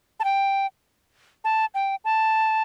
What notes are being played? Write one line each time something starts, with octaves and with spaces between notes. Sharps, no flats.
A5
G5
A5
G5
A5